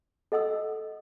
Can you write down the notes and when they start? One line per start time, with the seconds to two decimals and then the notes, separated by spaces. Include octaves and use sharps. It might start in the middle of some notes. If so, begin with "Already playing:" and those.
0.32 A4 D#5 F#5 D#6 E6